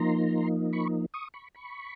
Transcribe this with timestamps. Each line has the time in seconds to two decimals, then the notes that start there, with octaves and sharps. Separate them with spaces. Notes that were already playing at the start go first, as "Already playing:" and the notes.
Already playing: F3 A#3 D#4 A#5 C6
0.73 B5 C#6
1.14 C#6 D#6
1.34 B5 C#6
1.54 B5 C#6